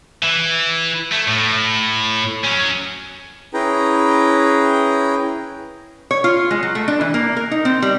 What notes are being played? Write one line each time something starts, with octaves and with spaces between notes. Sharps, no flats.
E3
A3
A2
F#3 C#4
C#4 E4 G#4 B4 G5 A#5
C#5
F4
G#3
F#3
A3
D4
E3
A#3
A#4
D#4
C4
G3